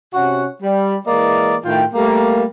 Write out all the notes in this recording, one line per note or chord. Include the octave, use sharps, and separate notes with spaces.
C3 C#4 F#4 F#5
G3
E3 G#3 A#3 D5 D#5
A2 D#3 F4 G5
G3 A3 A#3